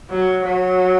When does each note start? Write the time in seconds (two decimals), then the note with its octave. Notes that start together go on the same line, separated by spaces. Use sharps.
0.10 F#3
0.45 F#3